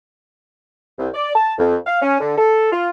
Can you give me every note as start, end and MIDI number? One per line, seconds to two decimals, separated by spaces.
0.99 1.08 36
1.14 1.31 74
1.35 1.53 81
1.58 1.76 41
1.87 2.02 77
2.02 2.20 61
2.20 2.37 50
2.37 2.70 69
2.72 2.89 65